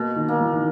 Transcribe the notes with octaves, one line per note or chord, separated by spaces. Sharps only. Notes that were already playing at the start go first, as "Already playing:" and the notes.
Already playing: B2 A#3
D#3
A#3
E3
D#3